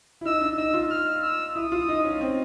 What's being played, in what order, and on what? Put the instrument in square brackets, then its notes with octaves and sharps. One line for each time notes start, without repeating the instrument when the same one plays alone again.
[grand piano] E4
[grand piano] D#4 [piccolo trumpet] E6
[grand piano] D4
[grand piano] D#4 [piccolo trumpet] E6
[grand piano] F4
[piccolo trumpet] F6
E6
[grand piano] E4 [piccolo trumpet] D#6
[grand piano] F4
D#4
C#4
C4